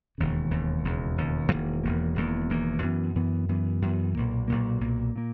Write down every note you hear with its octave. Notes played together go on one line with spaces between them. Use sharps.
E1 D#2 C#3
E1 D#2 C#3
E1 D#2 C#3
E1 D#2 C#3
E1 E2 D#3 A#3
E1 E2 D#3 A#3
E1 E2 D#3 A#3
E1 E2 D#3 A#3
F#2 E3 B3
F#2 E3 B3
F#2 E3 B3
F#2 E3 B3
B1 A#2 A#3
B1 A#2 A#3
B1 A#2 A#3
A#2 A#3